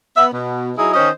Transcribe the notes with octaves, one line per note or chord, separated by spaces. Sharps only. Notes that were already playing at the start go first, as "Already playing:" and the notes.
B3 E5
B2
F#3 D#4 E4 G#4
D#3 C#4 C5 D#5